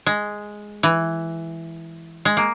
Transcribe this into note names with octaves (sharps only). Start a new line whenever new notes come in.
G#3
E3
G#3
A#3